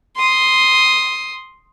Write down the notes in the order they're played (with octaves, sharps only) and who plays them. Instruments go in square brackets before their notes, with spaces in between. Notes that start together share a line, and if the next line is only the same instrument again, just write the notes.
[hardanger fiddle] C6 D#6